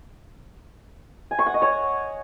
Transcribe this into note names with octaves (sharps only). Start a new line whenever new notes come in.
G#5
C#6
F#5
D#5
C#5